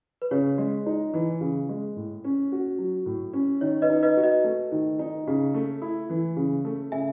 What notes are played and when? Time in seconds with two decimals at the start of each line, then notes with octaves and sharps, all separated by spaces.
0.22 B4
0.31 C#3 C#5
0.58 G#3
0.86 D#4
1.14 E3
1.41 C#3
1.69 G#3
1.96 A2
2.24 C#4
2.52 F#4
2.78 F#3
3.06 A2
3.33 C#4
3.61 D#3 C#5
3.82 B4 D#5
3.90 D#4
4.03 B4 D#5
4.17 F#4
4.23 B4 D#5
4.44 A3
4.72 D#3
4.99 D#4
5.27 C#3
5.54 A3
5.82 E4
6.09 E3
6.36 C#3
6.65 A3
6.92 C#3 E5 G#5